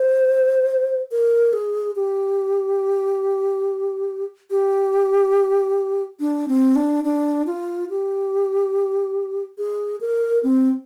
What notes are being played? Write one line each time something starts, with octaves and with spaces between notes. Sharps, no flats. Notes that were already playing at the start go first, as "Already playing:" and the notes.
Already playing: C5
A#4
G#4
G4
G4
D4
C4
D4
D4
F4
G4
G#4
A#4
C4